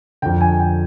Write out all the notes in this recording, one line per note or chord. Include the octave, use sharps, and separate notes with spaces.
F2 D3 G5
G#5
G5